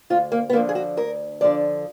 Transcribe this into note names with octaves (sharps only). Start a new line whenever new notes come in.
D2 F4
A#3
B3
D3 F3 A#3
G#4
F#4
D2 A#4
D3 F3 D5